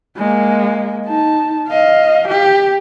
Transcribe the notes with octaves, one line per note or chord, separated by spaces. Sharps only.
G#3 A#3
D#4 A5
D#5 F5
G4